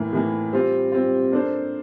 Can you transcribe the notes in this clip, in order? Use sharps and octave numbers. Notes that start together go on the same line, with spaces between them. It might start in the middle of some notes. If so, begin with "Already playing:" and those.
Already playing: A2 E3 A#3
A2 E3 A#3
G3 C4 F4
G3 C4 F4
A#3 D4 A4 C5